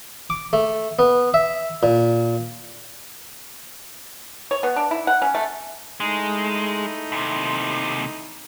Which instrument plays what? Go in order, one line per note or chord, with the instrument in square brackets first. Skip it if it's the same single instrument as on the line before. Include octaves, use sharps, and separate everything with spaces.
[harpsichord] D6
A3
B3
E5
A#2
[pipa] C#5
B3
D4
E4
F#5
C#4
A3
[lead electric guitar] G#3 [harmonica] A3 D#4 E4
[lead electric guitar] D#2 C3